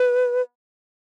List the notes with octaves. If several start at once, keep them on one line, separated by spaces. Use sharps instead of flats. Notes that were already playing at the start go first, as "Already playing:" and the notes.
Already playing: B4